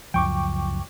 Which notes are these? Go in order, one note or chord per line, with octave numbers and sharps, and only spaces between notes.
C#2 F#2 F3 G5 C#6 D6